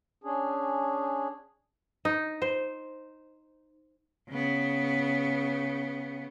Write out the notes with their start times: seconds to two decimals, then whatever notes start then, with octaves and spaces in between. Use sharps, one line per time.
0.24 C#4 D4 G#4
2.05 D#4
2.42 C5
4.30 C#3 B3